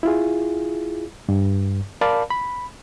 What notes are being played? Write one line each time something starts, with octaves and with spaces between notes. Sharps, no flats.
E4 F4 G#4
G2
A#4 D5 F5 A5 B5
B5